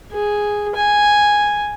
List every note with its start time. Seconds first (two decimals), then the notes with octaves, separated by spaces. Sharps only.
0.12 G#4
0.76 G#5